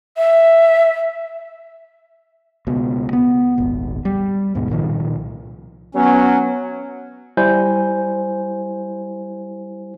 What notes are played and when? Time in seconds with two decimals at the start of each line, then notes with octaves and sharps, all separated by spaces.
0.17 E5
2.67 C#2 B2
3.13 B3
3.58 D#1 G#1
4.05 G3
4.55 D2 G#2 B2
4.70 C2 A#2 D#3 F3
5.95 F#3 B3 C#4
7.37 G3 E4 C5 G#5 G6